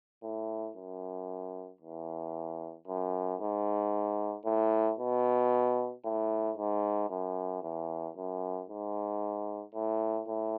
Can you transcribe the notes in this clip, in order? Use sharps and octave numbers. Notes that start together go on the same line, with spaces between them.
A2
F#2
E2
F#2
G#2
A2
B2
A2
G#2
F#2
E2
F#2
G#2
A2
A2